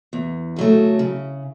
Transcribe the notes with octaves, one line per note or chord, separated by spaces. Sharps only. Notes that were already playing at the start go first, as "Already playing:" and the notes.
E2
C#3 F#3 A3
C#3